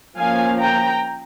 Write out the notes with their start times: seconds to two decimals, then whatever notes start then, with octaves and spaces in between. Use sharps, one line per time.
0.18 F3 A#3 C#4 F5 G#5
0.60 G5 A#5